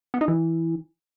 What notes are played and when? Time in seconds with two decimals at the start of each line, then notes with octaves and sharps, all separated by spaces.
0.14 B3
0.21 D#4
0.28 E3